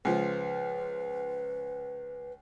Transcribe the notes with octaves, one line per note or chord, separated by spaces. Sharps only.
C#2 F3 B4